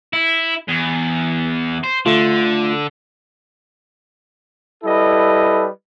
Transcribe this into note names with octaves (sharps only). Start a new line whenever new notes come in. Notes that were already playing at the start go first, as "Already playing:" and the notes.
E4
E2
C5
D3 A3 F4
G3 E4 A4 B4 D#5